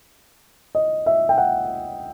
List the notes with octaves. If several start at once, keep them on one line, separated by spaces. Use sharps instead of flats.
D#5
E5
G5
F#5